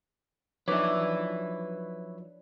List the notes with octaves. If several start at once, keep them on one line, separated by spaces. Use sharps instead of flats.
F3 F#3 D4 D#4 B4 C#5 E5 D6